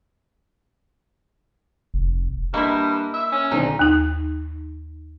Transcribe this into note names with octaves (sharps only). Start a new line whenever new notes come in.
F1
G2 A#3 E4 D#5 C6 G6
E5
C#4
B1 A#2 D3 C4 D#4
D#2 D#4